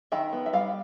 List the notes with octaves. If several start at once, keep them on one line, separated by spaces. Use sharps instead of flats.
D#3 E5
B3
E5
G3 F5